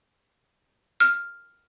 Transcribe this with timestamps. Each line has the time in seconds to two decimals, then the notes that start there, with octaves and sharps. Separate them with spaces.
1.00 F6